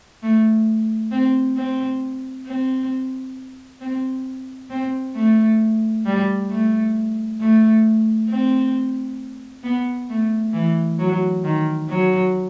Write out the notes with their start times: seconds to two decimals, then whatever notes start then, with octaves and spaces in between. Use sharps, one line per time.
0.22 A3
1.12 C4
1.56 C4
2.46 C4
3.81 C4
4.70 C4
5.15 A3
6.05 G3
6.50 A3
7.40 A3
8.30 C4
9.64 B3
10.10 A3
10.53 E3
10.99 F#3
11.44 D#3
11.89 F#3